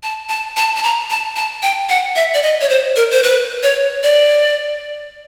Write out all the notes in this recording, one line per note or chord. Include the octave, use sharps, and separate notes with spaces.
A5
A5
A5
A5
A#5
A5
A5
G5
F#5
E5
D5
D#5
C#5
C5
A#4
C5
B4
C#5
D5